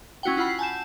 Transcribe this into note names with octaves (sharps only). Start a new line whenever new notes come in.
C#4 E4 F#4 F#5 G5
E4 F4 F#5 B5 C7
G#5 A5 G6 E7